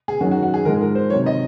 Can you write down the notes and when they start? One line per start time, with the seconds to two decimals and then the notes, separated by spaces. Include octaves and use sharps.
0.08 G#4
0.21 F#2 D#3 F#3 F#4
0.31 F#4
0.43 F#4
0.54 G#4
0.65 G#2 F3 G#3 A#4
0.81 A#4
0.95 C5
1.10 C3 D#3 F#3 C#5
1.26 D#5